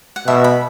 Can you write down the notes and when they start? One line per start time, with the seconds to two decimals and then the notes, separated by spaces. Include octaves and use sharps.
0.16 F#5
0.27 B2 E5
0.44 B5